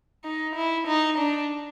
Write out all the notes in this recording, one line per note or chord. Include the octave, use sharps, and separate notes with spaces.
D#4
E4
D#4
D4